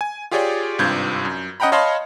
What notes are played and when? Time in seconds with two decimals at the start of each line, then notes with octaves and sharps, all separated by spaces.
0.01 G#5
0.31 F4 G4 G#4 C#5 D5 G5
0.79 G#1 G2 C3 F4 G6 G#6
1.25 F#2
1.60 C#4 D#5 F#5 G5 A#5 B5
1.72 C#5 D#5 F5 A5 B5 C6